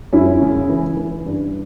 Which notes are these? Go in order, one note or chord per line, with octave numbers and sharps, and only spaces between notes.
F#2 C#4 E4
C#3
E3
E3
G2